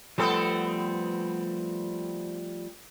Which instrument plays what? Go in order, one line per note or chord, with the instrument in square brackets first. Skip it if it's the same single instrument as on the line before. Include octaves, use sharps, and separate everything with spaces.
[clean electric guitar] F3 G3 A3 [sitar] B3 C4 A4